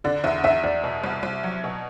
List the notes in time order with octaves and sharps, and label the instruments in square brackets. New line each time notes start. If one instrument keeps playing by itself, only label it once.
[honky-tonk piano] D3 [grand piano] D5
[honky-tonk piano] E2 [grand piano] E5
[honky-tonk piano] E2 [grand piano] E5
[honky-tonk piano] E2 [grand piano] D5
[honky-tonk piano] B2
C2
C2
F#3
B2